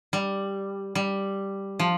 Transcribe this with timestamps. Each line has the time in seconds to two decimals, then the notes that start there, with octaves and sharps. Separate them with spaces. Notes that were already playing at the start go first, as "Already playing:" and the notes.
0.13 G3
0.95 G3
1.79 F3